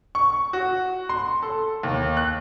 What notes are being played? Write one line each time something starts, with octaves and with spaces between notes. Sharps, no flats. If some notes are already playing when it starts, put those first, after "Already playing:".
C#6
F#4
C6
A4
D#2
F#6